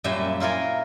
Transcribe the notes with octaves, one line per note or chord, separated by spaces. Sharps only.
F#2 A#2 G3 E5 G#5
E4 F4 A#4 G#5